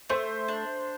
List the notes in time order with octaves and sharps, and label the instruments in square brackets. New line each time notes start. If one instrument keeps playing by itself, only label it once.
[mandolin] A3 [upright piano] C5
[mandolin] D4